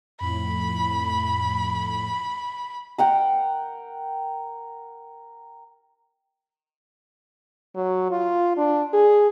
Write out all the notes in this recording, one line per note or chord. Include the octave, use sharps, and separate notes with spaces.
F2 A2 B5
A#4 F#5 G5
F#3
F4
D4
G#4